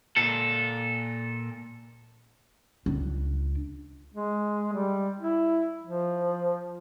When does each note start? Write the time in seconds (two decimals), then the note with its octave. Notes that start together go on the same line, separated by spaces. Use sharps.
0.16 A#2 A4
2.86 C#2 D4
4.14 G#3
4.72 G3
5.20 E4
5.84 F3